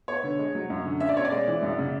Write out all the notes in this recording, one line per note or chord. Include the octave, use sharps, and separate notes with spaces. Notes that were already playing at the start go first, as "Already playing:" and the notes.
B3 C#5
D3
G#3
F#3
F#2
D3
C#4 E5
D5
B2 C#5
D5
G#3
E3
F#2
C#3